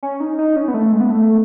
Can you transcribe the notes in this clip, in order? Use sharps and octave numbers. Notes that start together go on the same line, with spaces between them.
C#4
D#4
D#4
C#4
B3
A3
G#3
B3
A3